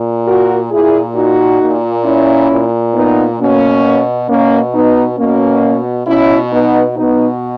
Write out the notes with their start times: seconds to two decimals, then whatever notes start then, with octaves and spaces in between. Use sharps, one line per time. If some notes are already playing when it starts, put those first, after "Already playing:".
Already playing: A#2
0.26 F#4 A#4
0.71 A#2 E4 G#4
1.15 D#4 F#4
1.61 A#2
2.04 C#4 E4
2.49 A#2
2.94 B3 D#4
3.39 B2 A#3 C#4
4.29 B2 A#3 C#4
4.74 B3 D#4
5.18 B2 A#3 C#4
6.07 B2 C#4 E4
6.52 B3 D#4
6.96 B2 B3 D#4